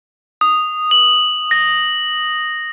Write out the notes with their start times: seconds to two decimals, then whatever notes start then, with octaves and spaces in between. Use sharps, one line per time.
0.41 D#6
0.91 F#7
1.51 A#6